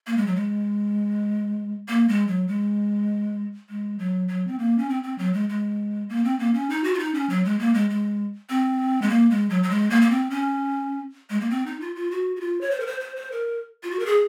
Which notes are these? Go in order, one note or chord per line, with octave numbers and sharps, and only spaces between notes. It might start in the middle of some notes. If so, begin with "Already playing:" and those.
A#3
G#3
F#3
G#3
A#3
G#3
F#3
G#3
G#3
F#3
F#3
C4
A#3
C#4
C4
C4
F#3
G#3
G#3
A#3
C4
A#3
C#4
D#4
F#4
F4
D#4
C#4
F#3
G#3
A#3
G#3
G#3
C4
G#3
A#3
G#3
F#3
F#3
G#3
A#3
A#3
C4
C#4
G#3
A#3
C4
D#4
F4
F4
F#4
F#4
F4
C#5
C5
A#4
C5
C5
C5
A#4
F4
F#4
A#4
G#4